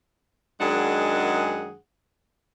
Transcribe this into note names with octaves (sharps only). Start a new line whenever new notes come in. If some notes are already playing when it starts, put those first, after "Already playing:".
F#2 D#3 G#3 D4 G#4 F#5